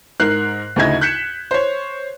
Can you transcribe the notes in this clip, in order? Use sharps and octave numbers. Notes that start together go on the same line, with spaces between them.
G#2 A#4 F#6 C7
D2 C#3 D#4 E4 D#5 G#6
F#6 G6 B6 C#7 E7
C5 C#5